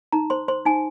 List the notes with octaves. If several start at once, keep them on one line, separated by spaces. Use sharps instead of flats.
D#4 A#5
C5 C6
C5 C6
D#4 G#5